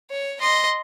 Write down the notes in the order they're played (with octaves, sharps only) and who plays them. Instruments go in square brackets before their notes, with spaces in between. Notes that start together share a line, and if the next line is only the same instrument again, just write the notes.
[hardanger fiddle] C#5
D#5 C6